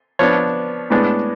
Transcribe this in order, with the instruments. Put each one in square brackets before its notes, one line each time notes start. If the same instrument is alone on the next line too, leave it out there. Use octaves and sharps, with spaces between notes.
[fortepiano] F3 B3 D4 C#5
A2 G#3 B3 D4